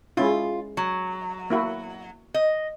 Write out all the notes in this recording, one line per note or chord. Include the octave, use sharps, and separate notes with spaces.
G#3 C#4 E4 F4
F#3
A#3 E4 F#4
D#5